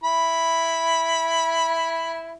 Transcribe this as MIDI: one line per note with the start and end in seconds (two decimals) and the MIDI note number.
0.04 2.33 64
0.04 2.33 83